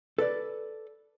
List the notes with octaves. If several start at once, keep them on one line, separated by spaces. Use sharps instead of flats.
A4 B4 D5